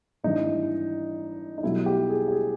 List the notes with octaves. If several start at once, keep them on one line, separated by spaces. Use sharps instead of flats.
G#1 G2 E3 D#4
D#4
B1 B2 G3 E4
G4
G#4
G4
G#4